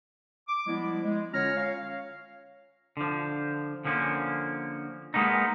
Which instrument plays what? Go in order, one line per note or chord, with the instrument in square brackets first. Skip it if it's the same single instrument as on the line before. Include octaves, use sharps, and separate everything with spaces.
[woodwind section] D6
F3 G3 G#3 B3 E4
G#3
D3 C#4 F4 C#5 A#5 F6
C#5 F5
[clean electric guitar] D3 F3
D3 F3 A#3 C#4
G#3 A#3 B3 D#4